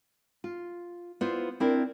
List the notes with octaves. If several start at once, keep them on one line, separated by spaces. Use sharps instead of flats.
F4
B3 E4 F4 C5
C4 D4 E4 A#4